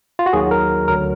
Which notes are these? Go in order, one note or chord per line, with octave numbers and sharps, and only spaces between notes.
F4
F#4
D#2 D#3 F#3 G#4
A#4
D2 D3 F#3 A#4